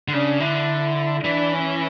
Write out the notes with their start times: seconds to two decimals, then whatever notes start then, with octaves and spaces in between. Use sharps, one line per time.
0.08 D3
0.13 C#3 D4
0.40 D3 E4
1.24 E3 D4
1.53 C#4